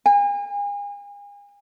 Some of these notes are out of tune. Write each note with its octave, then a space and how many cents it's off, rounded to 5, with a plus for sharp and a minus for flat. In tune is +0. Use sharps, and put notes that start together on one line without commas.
G#5 -40